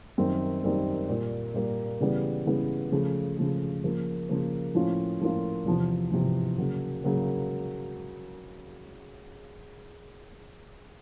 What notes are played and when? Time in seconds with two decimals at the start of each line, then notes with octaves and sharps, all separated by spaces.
0.18 F#2 D#3 G3 C4
0.64 F#2 D#3 G3 C4
1.09 A#2 G3 A#3
1.54 A#2 G3 A#3
2.00 C#3 E3 G3 B3
2.46 C#3 E3 G3 B3
2.92 C#3 F3 A3
3.38 C#3 F3 A3
3.83 C#3 F3 A#3
4.29 C#3 F3 A#3
4.75 A2 F3 A#3 C#4 F4
5.20 A2 F3 A#3 C#4 F4
5.66 E2 C3 F3
6.12 E2 C3 F3
6.58 C#3 F#3 A#3
7.04 C#3 F#3 A#3